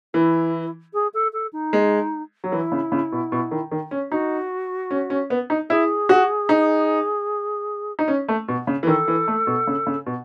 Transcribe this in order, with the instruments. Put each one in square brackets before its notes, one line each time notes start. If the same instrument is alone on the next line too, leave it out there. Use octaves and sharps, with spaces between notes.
[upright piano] E3 [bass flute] E4
[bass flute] G#4
A4
A4
D#4
[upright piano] G#3
F#3
[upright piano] E3 [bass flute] E4
[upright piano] C#3
C#3
B2
B2
D#3
D#3
C#4
[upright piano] D#4 [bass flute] F#4
[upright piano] C#4
C#4
B3
D#4
[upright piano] E4 [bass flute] G#4
[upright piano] F#4
D#4
D#4
C#4
A3
B2
C#3
E3
[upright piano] D#3 [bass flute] A4
[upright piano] E3
A3
B2
C#3
C#3
B2